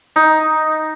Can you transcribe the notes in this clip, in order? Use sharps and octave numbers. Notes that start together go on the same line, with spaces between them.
D#4